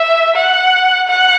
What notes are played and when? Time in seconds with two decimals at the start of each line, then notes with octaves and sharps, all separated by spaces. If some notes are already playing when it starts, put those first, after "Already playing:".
Already playing: E5
0.36 F#5
1.08 F#5